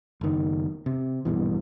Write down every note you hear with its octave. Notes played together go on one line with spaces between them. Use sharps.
F#1 D#3
C3
A#1 G2 B2 E3